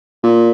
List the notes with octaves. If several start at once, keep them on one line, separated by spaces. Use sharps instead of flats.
A#2